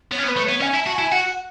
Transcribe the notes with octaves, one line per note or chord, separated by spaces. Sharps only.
B3 C#5
C#4
B3
B4
A3
B3 C#5
C#4 G#5
E4
A5
F#4
E4 G#5
F#4 F#5